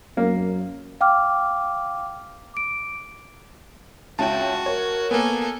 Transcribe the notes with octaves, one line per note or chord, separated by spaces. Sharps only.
F#2 A#3
F5 G5 D6 F6
D6 D7
C#2 C#4 F#4 E5 G5 A5
A#4 C#5
A#3 B3 A4 G#5